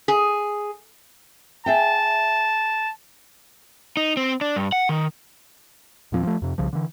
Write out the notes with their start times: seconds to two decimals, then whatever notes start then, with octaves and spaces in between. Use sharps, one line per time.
0.08 G#4
1.66 G#4 E5 G5 A5
3.97 D#4
4.17 C4
4.41 D4
4.56 G2
4.72 F#5
4.89 D#3
6.12 E2 A#2 F3 C4
6.23 F3 A3
6.42 F2 C3
6.58 C2 C#3 F3
6.73 D3 E3